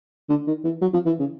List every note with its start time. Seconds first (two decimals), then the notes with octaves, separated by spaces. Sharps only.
0.29 D3
0.47 D#3
0.64 E3
0.81 F#3
0.93 F3
1.06 E3
1.19 C#3